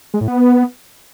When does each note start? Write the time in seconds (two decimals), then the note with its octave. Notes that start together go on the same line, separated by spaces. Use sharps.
0.14 G#3
0.21 A2
0.28 B3